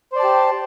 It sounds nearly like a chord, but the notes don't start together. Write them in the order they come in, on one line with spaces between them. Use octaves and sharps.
C5 D5 A5 G4